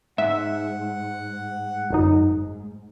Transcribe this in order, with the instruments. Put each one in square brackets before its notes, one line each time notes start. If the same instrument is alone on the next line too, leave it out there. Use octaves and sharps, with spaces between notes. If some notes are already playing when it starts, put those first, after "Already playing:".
[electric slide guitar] G#2 [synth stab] E5 [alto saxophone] F#5
[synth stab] G1 F#2 D#4